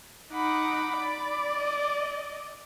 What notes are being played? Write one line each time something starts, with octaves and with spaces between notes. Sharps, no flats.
D#4 F#5 B5 D6
D5
D#5